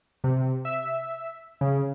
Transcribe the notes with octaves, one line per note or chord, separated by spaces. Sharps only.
C3
E5
C#3